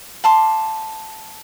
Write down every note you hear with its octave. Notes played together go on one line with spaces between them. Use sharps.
F5 A5 C6 D6